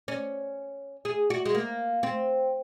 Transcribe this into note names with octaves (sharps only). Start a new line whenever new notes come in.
C#4
G#4
F#4
G#3
A#3
C4